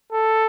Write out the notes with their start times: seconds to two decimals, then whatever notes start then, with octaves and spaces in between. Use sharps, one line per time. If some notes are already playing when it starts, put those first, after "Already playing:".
0.12 A4